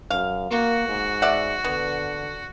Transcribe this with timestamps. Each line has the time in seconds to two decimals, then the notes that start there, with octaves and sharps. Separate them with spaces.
0.10 F#2 F5
0.51 A#3 F#4
0.88 G#2
1.22 D5 E5 F#5
1.64 D3 B3